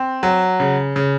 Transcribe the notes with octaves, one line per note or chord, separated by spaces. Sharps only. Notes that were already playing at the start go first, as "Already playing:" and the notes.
Already playing: C4
F#3
C#3
C#3